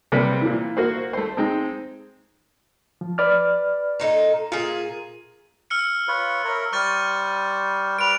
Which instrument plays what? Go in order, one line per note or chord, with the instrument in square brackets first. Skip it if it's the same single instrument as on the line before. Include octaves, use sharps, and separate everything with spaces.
[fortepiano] C3 G3 A#3 B4
A#2 E3
A#3 F#4 C5
A3 C5
G#3 C4 D#4
[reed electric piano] F3
B4 D5 F6
[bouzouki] A#2 D#4 A4
[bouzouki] A#2 G#4 [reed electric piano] F4
[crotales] E6 F6 C#7
[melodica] F4 B4 C#5
A#4 C#5 E5
[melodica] G3 C5 [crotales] C#6 F6 A6
[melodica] G3 B4 [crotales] D7 F7